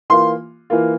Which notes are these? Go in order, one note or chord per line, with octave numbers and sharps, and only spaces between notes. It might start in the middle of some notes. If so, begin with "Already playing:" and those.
E3 A#3 F4 C6
E3 A#3 F4